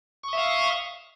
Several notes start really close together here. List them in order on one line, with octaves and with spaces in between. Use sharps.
C#6 D#6 E5 F5